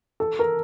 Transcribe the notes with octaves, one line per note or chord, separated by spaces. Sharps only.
A4
A#4